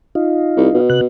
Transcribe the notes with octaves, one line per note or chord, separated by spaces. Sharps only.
D#4 F4
C2
B2
C3 B3 F#6